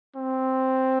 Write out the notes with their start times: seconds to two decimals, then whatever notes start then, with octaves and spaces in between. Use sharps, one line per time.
0.16 C4